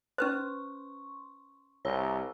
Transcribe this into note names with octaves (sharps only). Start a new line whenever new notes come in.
C#4 B4 C5 C6 C#6
C2 C#5 A#5 E6